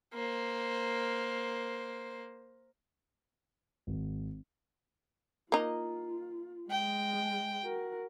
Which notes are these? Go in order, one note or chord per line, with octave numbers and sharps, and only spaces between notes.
A#3 C5
G#1
A#3 D#4 F4
G#3 G5
F#4 A#4